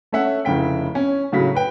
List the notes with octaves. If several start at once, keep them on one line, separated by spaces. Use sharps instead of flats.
A3 C#4 E5 F#5
F1 C#3 E4 G5 B6
C#4
A2 C#3 F#3 B6
B4 G5